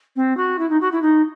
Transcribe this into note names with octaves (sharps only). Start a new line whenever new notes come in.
C4
F#4
E4
D#4
F#4
E4
D#4